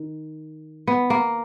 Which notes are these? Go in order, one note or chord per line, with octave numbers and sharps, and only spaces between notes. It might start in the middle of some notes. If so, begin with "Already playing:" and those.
Already playing: D#3
B3
A#3